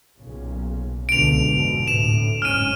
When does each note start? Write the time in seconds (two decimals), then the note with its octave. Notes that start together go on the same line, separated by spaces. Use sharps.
0.19 B1 A#2 C#3
1.09 C#2 B2 D3 D7 F7
1.51 F1 G#2 B2
1.88 D2 A2 E7
2.42 F#1 G#2 C#4 F6 D#7